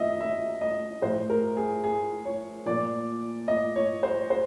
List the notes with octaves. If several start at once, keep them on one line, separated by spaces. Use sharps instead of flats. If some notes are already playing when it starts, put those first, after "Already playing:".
Already playing: F#2 D#3 D#5 E5
E5
D#5
A2 F3 C5
A#4
G#4
G#4
C#5
A#2 F3 D5
D#5
C#5
C5
C5